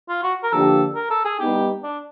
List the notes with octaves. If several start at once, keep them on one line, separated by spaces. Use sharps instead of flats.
F4
F#4
A#4
D3 F3 A#3 D4 G4 A4
A#4
A4
G#4
G3 B3 D#4 G4
D4